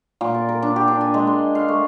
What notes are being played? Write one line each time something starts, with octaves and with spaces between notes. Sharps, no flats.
A#2
D5
A#4
D4
G4
D4
G#5
G#3
C6
F5
A3